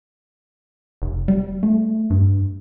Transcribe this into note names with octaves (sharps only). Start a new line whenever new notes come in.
F1
G3
A3
G2